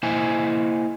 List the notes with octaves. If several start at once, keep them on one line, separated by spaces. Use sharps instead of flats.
A#3 E4 C5 D#5 G#5